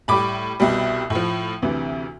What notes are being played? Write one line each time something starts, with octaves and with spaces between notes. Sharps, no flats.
A2 G3 B5 D6
C2 B2 G3
A2
F3
D2 C3 E3